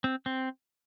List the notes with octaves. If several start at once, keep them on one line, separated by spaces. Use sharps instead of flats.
C4
C4